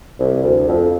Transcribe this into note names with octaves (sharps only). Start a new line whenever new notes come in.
C2
D2
F2